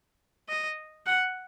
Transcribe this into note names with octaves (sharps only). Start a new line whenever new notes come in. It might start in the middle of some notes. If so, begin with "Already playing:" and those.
D#5
F#5